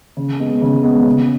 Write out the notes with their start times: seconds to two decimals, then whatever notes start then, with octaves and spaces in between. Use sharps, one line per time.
0.17 C#3
0.40 G#3 B3
0.62 C#3
0.83 G#3 B3
1.06 C#3